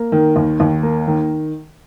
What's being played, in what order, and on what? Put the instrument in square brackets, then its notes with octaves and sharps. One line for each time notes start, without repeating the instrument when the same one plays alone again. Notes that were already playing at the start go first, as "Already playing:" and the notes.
Already playing: [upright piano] A#3
D#3
D#2
D#2
A#3
D#3